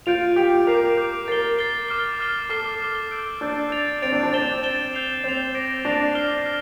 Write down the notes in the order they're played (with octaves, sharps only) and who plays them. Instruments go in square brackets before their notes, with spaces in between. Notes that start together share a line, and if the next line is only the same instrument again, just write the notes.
[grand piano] F4 [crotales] G6 D7 F7
[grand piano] G4 [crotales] G6 D7 F7
[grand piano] A#4 [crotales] D6 G6 C7 F7
[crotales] D6 G6 C7 F7
[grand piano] A#4 [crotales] A6 C7 G7
[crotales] A6 C7 G7
D6 F6 C7 G7
D6 F6 C7 G7
[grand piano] A4 [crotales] D6 F6 C7 G7
[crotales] D6 F6 C7 G7
E6 G6 D7
[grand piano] D4 [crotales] E6 G6 D7
[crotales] A6 D7 F7
[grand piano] C4 [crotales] A6 D7 F7
[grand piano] D4
D4
[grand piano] C4 [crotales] A6 E7 G7
[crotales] A6 E7 G7
G6 C7 F7
[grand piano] C4 [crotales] G6 C7 F7
[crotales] D6 G6 A#6 D7 F7
[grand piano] D4 [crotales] D6 G6 A#6 D7 F7
[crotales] F6 C7 G7
F6